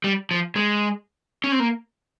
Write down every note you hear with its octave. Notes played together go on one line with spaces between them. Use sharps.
G3
F3
G#3
C#4
C4
A#3